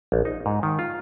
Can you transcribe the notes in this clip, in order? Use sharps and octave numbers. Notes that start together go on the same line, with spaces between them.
A#1
D#4
G#2
D#3
F4